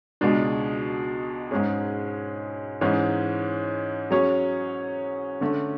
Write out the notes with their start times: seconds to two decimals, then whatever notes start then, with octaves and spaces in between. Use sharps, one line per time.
0.21 C#2 B2 G#3 D4
1.51 G#2 G#3 C#4 G#4
2.81 G#2 E3 G#3 C#4
4.11 F#3 C#4 G#4 C#5
5.41 D3 A3 C#4